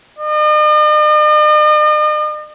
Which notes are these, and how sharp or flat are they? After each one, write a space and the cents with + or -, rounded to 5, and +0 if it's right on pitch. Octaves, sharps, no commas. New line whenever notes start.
D#5 -45